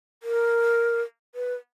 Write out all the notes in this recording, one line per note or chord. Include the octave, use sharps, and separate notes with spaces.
A#4
B4